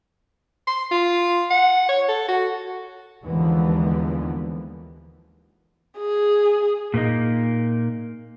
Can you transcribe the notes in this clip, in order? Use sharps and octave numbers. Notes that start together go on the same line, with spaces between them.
C6
F4
F#5
C#5
A4
F#4
D#2 D3 E3 F3 G#3 B3
G#4
A#2 A#3 D#4